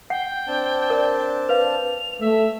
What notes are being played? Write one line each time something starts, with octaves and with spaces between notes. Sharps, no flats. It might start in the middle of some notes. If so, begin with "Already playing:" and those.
F#5 G5
C4 D4 A5
A#4 D5
B4 F5 F7
A3 E5